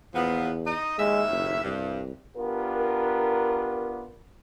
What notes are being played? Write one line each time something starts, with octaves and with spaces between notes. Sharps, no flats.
E2 A#2 F3 B3
D#4 D#5
D#2 A2 G#3 E5
F#1
C2 G2
B3 D4 F4 G4 A#4